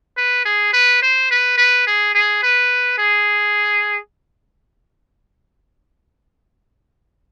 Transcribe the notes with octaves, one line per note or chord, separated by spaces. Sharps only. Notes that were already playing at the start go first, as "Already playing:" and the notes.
B4
G#4
B4
C5
B4
B4
G#4
G#4
B4
G#4